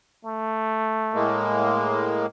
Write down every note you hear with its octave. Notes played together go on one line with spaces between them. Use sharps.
A3
A2 G#3 A#3